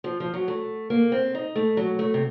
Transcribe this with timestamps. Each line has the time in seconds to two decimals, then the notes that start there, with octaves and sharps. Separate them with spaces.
0.04 F3
0.20 F3
0.34 F#3
0.48 A3
0.90 A#3
1.12 C4
1.35 D#4
1.55 A3
1.77 F#3
1.99 A3
2.14 C3